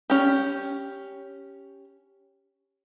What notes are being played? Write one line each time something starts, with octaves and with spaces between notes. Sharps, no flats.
C#4 G4